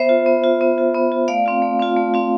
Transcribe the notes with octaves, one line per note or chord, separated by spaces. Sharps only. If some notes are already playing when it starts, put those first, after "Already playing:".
Already playing: B3 C5 E5
F4
B3
F4
B3
F4
B3
F4
A3 D5 F5
C4 F4
A3
C4 F4
A3
C4 F4